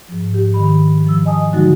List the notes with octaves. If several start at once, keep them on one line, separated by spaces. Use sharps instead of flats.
G#2 F3
G4
D#3 B5
F3 E6
D#5 G#5 A5 D#6
D3 F3 F#3 G#3 D#4 F#4